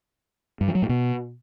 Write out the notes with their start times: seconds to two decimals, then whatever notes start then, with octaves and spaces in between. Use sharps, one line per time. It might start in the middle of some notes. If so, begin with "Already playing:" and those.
0.61 G2
0.68 F3
0.75 F#3
0.82 A2
0.89 B2